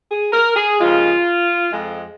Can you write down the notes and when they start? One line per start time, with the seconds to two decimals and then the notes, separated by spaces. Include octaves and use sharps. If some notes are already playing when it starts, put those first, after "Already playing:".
0.09 G#4
0.33 A#4
0.56 G#4
0.79 D#2 C#3 F3 G#3 F4
1.72 F2 F3 G#3